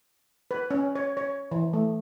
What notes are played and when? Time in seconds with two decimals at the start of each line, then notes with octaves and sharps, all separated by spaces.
0.51 B4
0.71 C#4
0.95 C#5
1.17 C#5
1.51 E3
1.73 A3